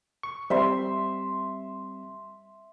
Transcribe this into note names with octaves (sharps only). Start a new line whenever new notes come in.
C#6
G3 C4 E5 C6